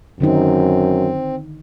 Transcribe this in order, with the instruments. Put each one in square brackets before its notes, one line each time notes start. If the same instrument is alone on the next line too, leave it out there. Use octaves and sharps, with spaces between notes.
[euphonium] F#2 [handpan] D3 D#3 D#4 [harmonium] C4